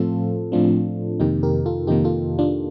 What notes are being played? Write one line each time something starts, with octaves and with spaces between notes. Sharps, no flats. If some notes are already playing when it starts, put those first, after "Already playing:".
Already playing: A2 F3 A3 C4 F4 A4
A2 F3 A3 C4 D4 F4
F2 C3 D#3 A#3 D#4 G4
G4 A#4
F4 A4
F2 C3 D#3 A#3 D#4 G4
F4 A4
D4 F4